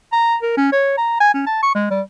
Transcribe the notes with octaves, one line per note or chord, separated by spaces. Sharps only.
A#5
A#4
C#4
C#5
A#5
G#5
C#4
A5
C#6
G#3
G3